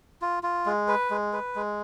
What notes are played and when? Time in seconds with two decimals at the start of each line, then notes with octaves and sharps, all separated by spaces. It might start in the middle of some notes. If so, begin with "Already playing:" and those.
0.22 F4
0.43 F4
0.66 G#3
0.88 B4
1.10 G#3
1.33 B4
1.55 G#3